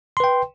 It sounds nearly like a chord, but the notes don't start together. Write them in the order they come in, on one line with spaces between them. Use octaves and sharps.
C6 B4 G5